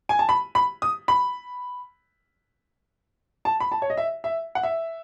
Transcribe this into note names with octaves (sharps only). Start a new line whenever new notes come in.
G#5
A5
B5
B5
D#6
B5
A5
B5
A5
C#5
D#5
E5
E5
F#5
E5